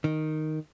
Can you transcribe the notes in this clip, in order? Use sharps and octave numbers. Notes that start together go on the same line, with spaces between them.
D#3